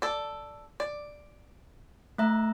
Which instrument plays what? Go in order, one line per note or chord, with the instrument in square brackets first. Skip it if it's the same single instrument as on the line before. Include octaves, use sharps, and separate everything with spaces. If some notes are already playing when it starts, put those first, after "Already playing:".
[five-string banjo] A4 D5
D5
[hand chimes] A3 E5 A#5